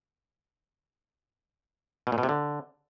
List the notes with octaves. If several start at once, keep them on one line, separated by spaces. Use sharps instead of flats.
B2
A#2
B2
C3
D3